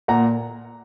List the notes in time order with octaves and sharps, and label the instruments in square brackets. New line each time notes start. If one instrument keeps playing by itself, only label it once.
[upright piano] A#2 F#5 A#5